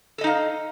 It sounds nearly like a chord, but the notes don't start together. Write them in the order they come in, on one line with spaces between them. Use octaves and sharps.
A4 D#5 D#4 F5